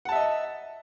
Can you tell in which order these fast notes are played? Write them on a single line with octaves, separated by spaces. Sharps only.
F#5 A5 E5 D#5